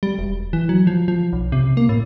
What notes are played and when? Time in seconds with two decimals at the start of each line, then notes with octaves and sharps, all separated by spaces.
0.03 G3
0.19 E1
0.53 E3
0.69 F#3
0.87 F3
1.08 F3
1.33 B1
1.52 C3
1.77 A#3
1.89 A2